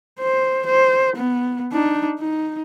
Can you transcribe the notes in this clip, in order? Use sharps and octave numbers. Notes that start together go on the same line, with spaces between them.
C5
C5
B3
D4 D#4
D#4